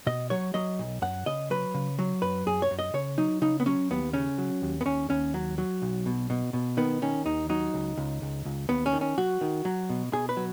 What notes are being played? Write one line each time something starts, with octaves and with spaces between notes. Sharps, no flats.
B2 D#5
F#3 C#5
F#3 D#5
B1
F#2 F#5
C#3 D#5
F#3 B4
C#3
F#3
F#2 B4
F#2 G#4
C#5
F#2
D#5
C#3 C#5
F#3 D#4
C#3 D#4
B3
F#3 C#4
D#2 B3
C#3 C#4
F#3
D#2
B3
D#2 C#4
D#2 C#4
F#3
F#3
B1
B2
B2
B2
D#3 B3
D#3 C#4
D#2 D#4
F#3 D#4
C#2
C#2
C#2
C#2
D#2 B3
C#4
D#3
C#4
F#3 F#4
D#3
F#3
B2
B2 G#4
B4
F#3